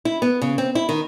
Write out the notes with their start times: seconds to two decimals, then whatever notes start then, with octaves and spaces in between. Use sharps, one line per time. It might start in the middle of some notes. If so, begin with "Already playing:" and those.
0.05 E4
0.22 B3
0.42 C#3
0.58 C4
0.75 E4
0.89 D#3